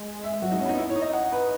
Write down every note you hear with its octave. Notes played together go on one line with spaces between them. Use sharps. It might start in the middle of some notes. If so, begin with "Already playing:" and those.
Already playing: G#3
E5
F#3 F#4
G#3 D#4
C#4
B3 D#4
E4
C#5
D#4
D#5
F#5
B4